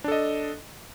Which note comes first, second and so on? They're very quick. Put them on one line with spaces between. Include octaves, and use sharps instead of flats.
D4 A4 D#5